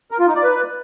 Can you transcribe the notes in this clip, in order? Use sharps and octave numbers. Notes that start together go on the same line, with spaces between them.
A#4
F4
D#4
D5
B4